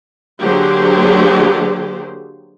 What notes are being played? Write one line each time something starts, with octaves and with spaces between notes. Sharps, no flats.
D3 F#3 A#3 G4 G#4 C5